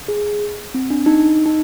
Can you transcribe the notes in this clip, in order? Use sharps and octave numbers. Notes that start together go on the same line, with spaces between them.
G#4
C4
D4
D#4
D#4